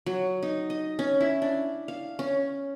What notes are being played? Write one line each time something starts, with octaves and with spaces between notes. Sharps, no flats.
F#3
D#4
D#5
C#4
E4
D4
F5
C#4